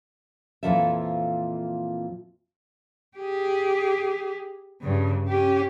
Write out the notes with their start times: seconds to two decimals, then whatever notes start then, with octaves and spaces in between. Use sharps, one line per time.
0.63 F2 A#2 E3 F3 A4 E5
3.17 G4 G#4
4.81 G2 C#3
5.28 C#4 G4